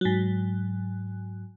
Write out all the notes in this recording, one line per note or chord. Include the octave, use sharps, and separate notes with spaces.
G#2 F#3